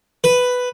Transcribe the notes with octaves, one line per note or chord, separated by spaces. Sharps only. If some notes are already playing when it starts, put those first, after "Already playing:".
B4